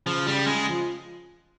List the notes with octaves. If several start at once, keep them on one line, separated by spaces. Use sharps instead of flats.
C#3 F3
C#3 G3
C#3 G#3
F3